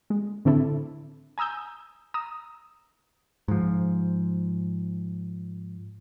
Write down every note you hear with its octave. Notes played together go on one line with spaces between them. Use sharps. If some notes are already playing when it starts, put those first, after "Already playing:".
G#3
A2 D3 C4 D4 E4 A4
G#5 A#5 D#6 E6 G6
A#5 D#6 E6
G#2 F3